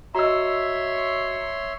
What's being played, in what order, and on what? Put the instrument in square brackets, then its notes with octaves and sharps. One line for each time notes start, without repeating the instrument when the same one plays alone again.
[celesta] F#4 D#5 [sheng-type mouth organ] C#5 E5 C6 [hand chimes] A#5 E6